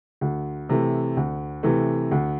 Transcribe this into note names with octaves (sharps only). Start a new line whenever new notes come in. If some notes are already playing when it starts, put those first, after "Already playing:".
D2
C3 E3 A3
D2
C3 E3 A3
D2